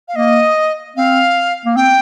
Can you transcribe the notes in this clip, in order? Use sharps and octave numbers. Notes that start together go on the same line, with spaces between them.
F5
A#3 D#5
C4 F5
A#3
C4 G5